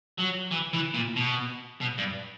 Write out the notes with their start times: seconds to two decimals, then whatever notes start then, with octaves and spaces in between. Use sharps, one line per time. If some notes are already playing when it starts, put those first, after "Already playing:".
0.18 F#3
0.51 E3
0.73 E3
0.94 A#2
1.16 B2
1.81 B2
1.98 G2